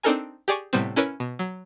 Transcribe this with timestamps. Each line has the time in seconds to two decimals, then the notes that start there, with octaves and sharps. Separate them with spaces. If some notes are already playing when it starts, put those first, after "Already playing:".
0.03 C4 D4 D#4 A4 A#4 G#5
0.48 G4 G#4 D5 G#5 C#6
0.73 A2 C3 G3 B3 C4
0.96 C#4 E4 A#4 B4 C#5
1.20 B2
1.39 F#3